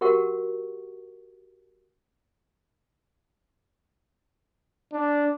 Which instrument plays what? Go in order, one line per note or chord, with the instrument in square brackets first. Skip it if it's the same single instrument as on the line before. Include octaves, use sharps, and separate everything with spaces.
[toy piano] F#4 G4 A#4 F#5 C#6
[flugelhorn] D4